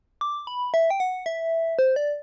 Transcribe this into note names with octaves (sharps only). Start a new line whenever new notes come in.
D6
B5
E5
G5
F#5
E5
C5
D5